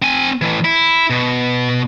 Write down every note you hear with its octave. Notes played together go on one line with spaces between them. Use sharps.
C4 G#5
A2 E3
E4
B2